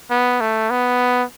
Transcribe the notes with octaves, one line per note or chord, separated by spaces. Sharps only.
B3
A3
B3